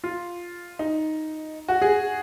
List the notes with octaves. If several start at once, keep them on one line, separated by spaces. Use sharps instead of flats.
F4
D#4
F#4
G#4